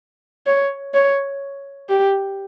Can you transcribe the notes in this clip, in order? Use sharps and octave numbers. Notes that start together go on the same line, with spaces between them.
C#5
C#5
G4